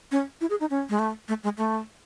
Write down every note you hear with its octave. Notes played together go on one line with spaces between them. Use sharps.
C#4
E4
G#4
D#4
C#4
G#3
A3
A3
G#3
A3